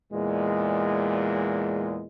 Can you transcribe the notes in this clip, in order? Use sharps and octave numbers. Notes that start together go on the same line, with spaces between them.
E2 A#2 G#3